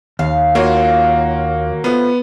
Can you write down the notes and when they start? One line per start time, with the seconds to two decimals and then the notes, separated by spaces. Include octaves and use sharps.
0.19 D#2 F5
0.55 A#3 F4 F#4 C#5 F5
1.84 A2 F3 B3